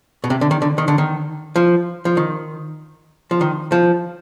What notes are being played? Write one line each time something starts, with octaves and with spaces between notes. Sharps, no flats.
B2
C3
D3
D#3
D3
D#3
D3
D#3
F3
F3
D#3
F3
D#3
F3